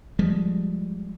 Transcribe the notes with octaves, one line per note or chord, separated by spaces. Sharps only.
F3 G3 G#3